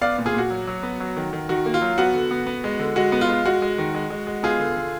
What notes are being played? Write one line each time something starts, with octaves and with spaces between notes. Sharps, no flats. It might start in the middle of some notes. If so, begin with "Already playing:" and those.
B3 D5 F5
A#2
F4 G#4
A#2 F#4
F#3
F#3
B3
F#3
D#3
D#3
D#3 F#4
A#3
F4
F#3
B3 F#4
D3
B3
B3
G#3
D3
G#3 F#4
B3
F4
G#3
G#3 F#4
G#3
D#3
G#3
G#3
G#3
B3 F4 G#4
D3
D3